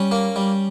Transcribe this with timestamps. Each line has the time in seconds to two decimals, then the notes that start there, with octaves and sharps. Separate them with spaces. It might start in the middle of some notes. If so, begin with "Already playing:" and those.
Already playing: G3 C#4
0.12 A#3
0.36 G3